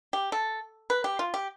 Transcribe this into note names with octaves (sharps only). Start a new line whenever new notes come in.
G4
A4
B4
G4
F4
G4